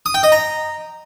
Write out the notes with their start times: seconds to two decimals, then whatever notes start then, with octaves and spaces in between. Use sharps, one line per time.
0.06 D#6
0.14 G5
0.23 D#5
0.32 A#5